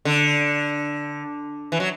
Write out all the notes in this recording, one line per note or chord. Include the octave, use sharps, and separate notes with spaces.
D3
E3
F#3